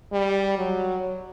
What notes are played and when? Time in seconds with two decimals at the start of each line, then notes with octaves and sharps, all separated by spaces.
0.12 G3
0.57 F#3